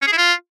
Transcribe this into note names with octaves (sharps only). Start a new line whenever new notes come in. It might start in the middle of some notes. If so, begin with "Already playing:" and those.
C#4
G#4
E4
F4